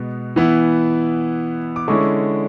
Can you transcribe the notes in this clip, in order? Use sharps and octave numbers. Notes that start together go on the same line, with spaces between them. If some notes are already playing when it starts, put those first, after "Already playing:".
Already playing: B2 G#3 B3
E3 B3 E4
D6
D3 G#3 C#4 E4 C#6